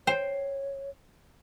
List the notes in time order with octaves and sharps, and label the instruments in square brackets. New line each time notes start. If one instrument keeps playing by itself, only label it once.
[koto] C5 [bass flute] C#5 [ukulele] G5